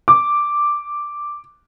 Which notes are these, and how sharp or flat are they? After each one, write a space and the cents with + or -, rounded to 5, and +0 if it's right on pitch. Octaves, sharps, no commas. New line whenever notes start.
D6 +0